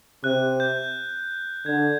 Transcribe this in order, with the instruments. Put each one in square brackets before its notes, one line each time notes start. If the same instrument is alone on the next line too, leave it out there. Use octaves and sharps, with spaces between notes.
[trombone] C3 [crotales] F#6
[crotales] G6
[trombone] D3 [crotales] G#6